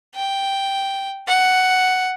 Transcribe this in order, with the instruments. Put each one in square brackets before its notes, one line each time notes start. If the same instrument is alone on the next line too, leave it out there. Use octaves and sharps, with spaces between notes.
[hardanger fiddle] G5
F#5